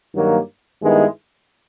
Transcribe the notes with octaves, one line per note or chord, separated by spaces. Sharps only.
G2 D#3 F#3 A#3
G2 D#3 G#3 B3 E4